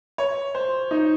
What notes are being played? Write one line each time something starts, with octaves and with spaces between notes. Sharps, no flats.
C#5
C5
D#4